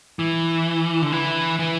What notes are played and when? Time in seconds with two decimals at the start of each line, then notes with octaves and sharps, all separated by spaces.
0.19 E3
1.02 D3
1.12 E3
1.59 E3